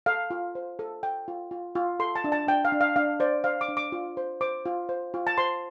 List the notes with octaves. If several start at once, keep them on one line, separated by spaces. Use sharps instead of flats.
A4 F5
F4
C5
A4
A4 G5
F4
F4
F4
A4 C6
A5
D4
A5
D4 G5
F5
D4
F5
D4 F5
C5 D5
C5 F5
D6
D4
D6
F4
C5
C5 D6
F4
C5
F4
A5
C5 C6